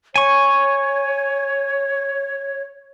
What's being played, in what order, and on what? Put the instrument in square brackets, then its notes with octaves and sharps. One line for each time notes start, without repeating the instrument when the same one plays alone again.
[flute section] C#5 [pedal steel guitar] G#5 C#6